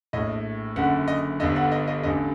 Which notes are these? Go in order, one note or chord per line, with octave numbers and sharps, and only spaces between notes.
A#1 A2 D#5
F#1 F#2 D3 F#5
D#5
G1 G2 D3 D#5
F#5
D#5
D#5
A1 G2 D3 D#5